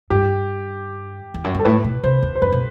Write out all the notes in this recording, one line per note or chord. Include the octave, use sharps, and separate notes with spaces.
G2 G4
E2
F#2
G2 A4
A2 B4
B2
C3 C5
E2
C5
F#2 B4
B2